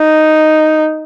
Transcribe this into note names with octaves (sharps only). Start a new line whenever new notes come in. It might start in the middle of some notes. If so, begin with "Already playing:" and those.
Already playing: D#4